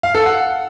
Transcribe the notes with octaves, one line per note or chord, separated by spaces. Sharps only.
F5
A4
F#5